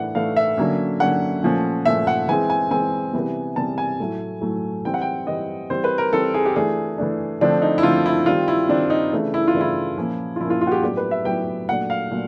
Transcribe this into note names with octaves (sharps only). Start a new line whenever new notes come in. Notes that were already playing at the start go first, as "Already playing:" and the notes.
Already playing: A2 E3 A3 D4 F#5
A2 E3 A3 D4 F5
E5
D3 F#3 A#3 C#4
D3 F#3 A#3 C#4 F#5
A#2 F3 A3 C#4
A#2 F3 A3 C#4 E5
F#5
E3 G#3 C4 G#5
G#5
E3 G#3 C4 G#5
C3 E3 G3 B3
C3 E3 G3 B3 A5
G#5
A2 F#3 A3
A2 F#3 A3
E3 G3 C4 G5
F#5
G5
E3 G3 C4 D#5
E3 G3 C4 C5
B4
A#4
E3 G3 C4 A4
G#4
G4
E3 A3 D4 G#4
E3 A3 D4
D3 F3 A3 C4 D4
D#4
E4
D3 F3 A3 C4 F4
E4
D#3 G3 C4 F4
E4
D#3 G3 C4 D4
D#4
C#3 E3 A3 D4
E4
F4
C#3 E3 A3 D4
E4
A#2 F3 A#3 C#4
F4
A#2 F3 A#3 C#4 E4
F4
F4
F#4
G4
A2 F#3 B3 D4 G4
B4
E5
A2 F#3 B3 D4 G5
A#2 F#3 A3 D4 F#5
F5
A#2 F#3 A3 D4